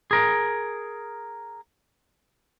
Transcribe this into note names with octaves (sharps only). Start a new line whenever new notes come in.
G#4 A#4